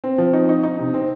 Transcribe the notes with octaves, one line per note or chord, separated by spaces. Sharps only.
C4
F3
D#4
D#4
D#4
C3
C4